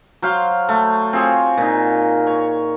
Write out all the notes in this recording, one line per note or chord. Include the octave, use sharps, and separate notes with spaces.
F#3 C5 F5 C6
A3
C4 F4 G#4 C#5
A#2 D#4
C#5